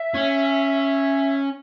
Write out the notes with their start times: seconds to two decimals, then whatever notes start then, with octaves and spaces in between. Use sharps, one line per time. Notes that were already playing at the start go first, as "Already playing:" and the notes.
Already playing: E5
0.14 C#4